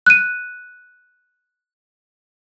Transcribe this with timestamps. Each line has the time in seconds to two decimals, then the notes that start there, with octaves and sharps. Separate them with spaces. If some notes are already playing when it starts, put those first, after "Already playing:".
0.06 F#6 D#7